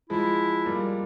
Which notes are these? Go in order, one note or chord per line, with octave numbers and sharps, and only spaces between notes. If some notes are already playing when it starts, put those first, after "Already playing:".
F3 G#3 E4
G3 A#3